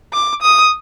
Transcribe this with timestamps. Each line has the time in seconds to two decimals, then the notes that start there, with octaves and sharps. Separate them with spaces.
0.13 D6
0.42 D#6